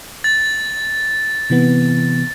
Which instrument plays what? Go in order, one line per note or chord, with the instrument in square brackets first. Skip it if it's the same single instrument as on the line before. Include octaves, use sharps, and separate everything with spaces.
[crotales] A6
[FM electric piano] C3 E3 B3